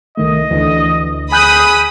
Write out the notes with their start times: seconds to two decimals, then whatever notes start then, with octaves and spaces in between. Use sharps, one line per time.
0.17 C2 D#3 A3 D#5
0.51 D2 E3
1.32 G#4 G#5 B5 D#6 F#6 G6